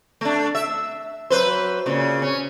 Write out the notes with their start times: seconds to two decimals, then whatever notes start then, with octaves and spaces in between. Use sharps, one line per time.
0.21 A3 D4
0.55 E5
1.30 F#3 B4 C5
1.86 A#2 C#3
2.22 C#4